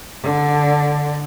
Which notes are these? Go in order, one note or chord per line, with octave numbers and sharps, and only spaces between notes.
D3 D5